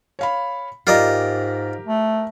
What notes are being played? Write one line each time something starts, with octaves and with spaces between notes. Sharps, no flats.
C#5 F5 B5
G#2 F4 G4 A#4 D5 D#5 A#5
A3